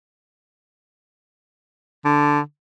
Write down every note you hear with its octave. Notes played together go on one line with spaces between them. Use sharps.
D3